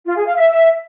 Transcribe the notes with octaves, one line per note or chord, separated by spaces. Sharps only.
F4
G#4
F5
E5